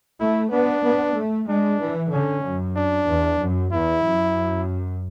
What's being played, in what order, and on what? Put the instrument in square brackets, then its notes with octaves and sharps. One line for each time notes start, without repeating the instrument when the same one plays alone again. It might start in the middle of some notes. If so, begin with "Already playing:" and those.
[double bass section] A3 [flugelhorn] E4
[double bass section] B3 [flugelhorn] D4
[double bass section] B3
A3
[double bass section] G#3 [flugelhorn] D4
[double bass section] E3
[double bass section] D3 [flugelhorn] C#4
[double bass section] F#2
[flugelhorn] D4
[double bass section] E2
F#2
[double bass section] E2 [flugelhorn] E4
[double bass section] F#2